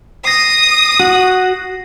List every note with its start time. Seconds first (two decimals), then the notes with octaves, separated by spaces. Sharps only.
0.25 D#6 A#6 C7
1.00 F#4